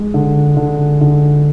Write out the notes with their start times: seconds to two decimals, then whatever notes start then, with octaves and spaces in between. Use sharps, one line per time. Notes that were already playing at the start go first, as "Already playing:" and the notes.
Already playing: G#3
0.14 D3
0.57 D3
1.01 D3